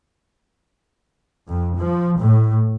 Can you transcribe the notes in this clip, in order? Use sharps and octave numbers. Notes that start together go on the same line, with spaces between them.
F2
F3
A2